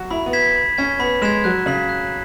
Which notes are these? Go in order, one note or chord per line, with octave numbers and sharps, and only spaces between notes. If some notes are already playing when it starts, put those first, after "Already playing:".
Already playing: F#3 F#4
E4 B5
B3
G#6 B6 E7
B5
C#4 G#6 B6 E7
B3 B5
G#3 G#6 B6 E7
F#3 F#6
C#3 B6 F#7
F#6